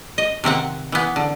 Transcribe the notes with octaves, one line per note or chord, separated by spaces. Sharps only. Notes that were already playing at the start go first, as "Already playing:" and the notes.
D#5
C3 D#3 C4 F#5
E3 B3
D3